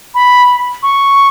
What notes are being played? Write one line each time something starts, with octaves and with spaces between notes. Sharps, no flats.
B5
C#6